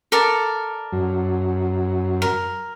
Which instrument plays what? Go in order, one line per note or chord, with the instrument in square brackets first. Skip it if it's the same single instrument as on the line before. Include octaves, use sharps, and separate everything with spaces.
[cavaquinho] A4 A#4 D5
[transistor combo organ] F#2
[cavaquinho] A#4